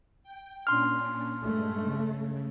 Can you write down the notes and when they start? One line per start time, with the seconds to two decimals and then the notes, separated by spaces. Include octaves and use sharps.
0.23 G5
0.67 A#2 C#4 D4 C6 F6
1.44 G2 G#3 A3
1.84 C#3